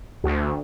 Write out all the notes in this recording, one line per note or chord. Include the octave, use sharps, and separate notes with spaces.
D2